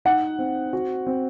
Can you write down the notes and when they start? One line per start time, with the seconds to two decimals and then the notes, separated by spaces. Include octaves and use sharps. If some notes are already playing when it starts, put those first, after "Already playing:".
0.05 D#4 F#5
0.39 C4
0.73 F#4
1.07 C4